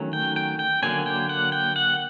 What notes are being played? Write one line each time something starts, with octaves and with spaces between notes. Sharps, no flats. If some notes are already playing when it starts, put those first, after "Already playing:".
Already playing: D#3 F#3 A3 C#4
G5
G5
G5
D3 F#3 A#3 C#4 G#5
G5
F#5
G5
F#5